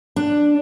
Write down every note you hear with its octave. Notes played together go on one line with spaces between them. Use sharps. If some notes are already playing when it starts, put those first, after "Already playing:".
D4